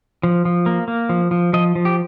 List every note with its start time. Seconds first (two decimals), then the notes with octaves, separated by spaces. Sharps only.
0.23 F3
0.45 F3
0.66 A#3
0.88 A#3
1.09 F3
1.31 F3
1.53 F3 D#5
1.75 F3
1.85 G4